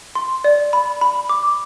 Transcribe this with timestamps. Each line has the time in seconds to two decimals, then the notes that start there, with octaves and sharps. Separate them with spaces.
0.15 C6
0.44 D5
0.73 B5
1.01 B5
1.29 D6